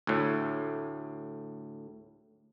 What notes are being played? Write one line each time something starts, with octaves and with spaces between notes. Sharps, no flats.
D2 A2